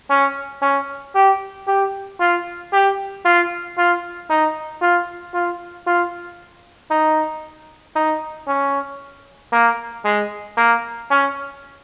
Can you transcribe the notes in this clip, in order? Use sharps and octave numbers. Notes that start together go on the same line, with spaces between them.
C#4
C#4
G4
G4
F4
G4
F4
F4
D#4
F4
F4
F4
D#4
D#4
C#4
A#3
G#3
A#3
C#4